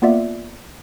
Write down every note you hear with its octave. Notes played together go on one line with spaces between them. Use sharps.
A#3 B3 F4 D5 E5